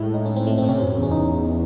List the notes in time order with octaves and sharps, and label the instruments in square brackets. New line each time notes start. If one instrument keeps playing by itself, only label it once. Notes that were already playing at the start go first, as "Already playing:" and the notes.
Already playing: [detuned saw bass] A2 [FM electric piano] G#3
[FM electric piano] D#4
C#4
C4
A3
C4
[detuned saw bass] A2
[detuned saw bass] C3 [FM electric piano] C#4
[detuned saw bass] F#2
E2
[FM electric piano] C#4
D#4